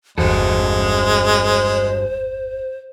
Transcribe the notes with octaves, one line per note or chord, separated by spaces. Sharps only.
G1 E2 G2 G#3 F#4 A4 C5